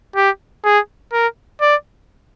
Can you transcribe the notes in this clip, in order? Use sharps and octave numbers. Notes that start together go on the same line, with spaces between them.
G4
G#4
A#4
D5